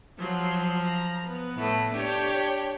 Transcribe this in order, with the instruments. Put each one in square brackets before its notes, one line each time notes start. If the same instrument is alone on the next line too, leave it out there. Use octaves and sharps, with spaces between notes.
[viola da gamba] F3 [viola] F#3 C6
[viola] A#5
B3 B4
[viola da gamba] A2 A3
[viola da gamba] D4 G4 [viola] C#5 G5